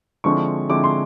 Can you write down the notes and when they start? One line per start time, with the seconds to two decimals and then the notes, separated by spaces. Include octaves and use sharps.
0.24 D3 F3 G#3 C4 E4 C#6
0.69 D3 F3 G#3 C4 E4 D6
0.84 C6